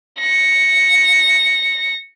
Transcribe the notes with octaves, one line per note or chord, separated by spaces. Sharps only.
A#6 C#7